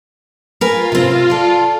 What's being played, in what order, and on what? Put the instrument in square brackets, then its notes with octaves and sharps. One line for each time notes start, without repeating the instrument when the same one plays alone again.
[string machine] F4 [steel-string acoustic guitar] A#4 B4 G#5
[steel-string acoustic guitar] C3 C4
A4 D5